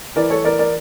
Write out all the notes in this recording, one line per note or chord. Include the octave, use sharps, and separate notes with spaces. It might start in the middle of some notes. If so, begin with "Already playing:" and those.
E3 A#4 D5
A4 C#5
E3 A#4 D5
A#4 D5